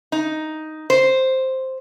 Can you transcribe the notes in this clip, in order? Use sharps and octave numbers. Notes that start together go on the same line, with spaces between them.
D#4
C5